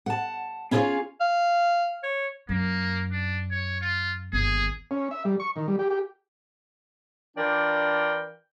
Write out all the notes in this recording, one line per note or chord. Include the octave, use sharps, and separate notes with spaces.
F#5 A5
C#4 E4 F4 G#4 C#5 F5
F5
C#5
F#2 A#3
D4
C#5
F4
G1 D#2 G#4
C#4
E5
G3
C#6
D#3
G3
G4
G4
E3 D4 F4 A#4 D5 G5